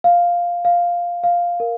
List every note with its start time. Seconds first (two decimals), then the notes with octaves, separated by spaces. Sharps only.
0.04 F5
0.65 F5
1.24 F5
1.60 A#4